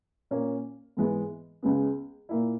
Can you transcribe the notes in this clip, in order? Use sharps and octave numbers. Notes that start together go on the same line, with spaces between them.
A#2 A#3 C#4
G#2 E3 G#3 B3
C#2 C#3 G#3 B3
A#2 A#3 E4